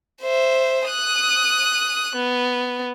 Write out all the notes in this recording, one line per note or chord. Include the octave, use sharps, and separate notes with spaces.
C5 E5
D#6 F#6
B3